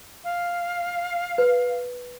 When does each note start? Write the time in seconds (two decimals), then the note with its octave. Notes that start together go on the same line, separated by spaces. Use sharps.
0.24 F5
1.38 B4